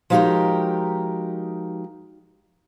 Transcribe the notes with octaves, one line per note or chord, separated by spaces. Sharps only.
F3 G#3 D#4 F#4 G4 A#4